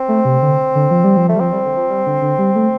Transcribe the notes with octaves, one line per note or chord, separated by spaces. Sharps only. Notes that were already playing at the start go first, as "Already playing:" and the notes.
Already playing: C4
A3
C3
D3
D3
F3
G3
F3
A3
G3
F3 C4
G3
D3
F3
G3
D3
D3
G3
A3